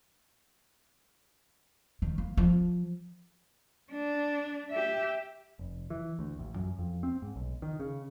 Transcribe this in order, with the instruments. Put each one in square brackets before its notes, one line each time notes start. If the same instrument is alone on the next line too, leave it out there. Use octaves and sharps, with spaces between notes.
[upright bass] D#3
A#3
F3
[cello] D4
G4 E5
[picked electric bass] F1
E3
D2
A1
F#2
F2
C4
G#2
B1
D#3
C#3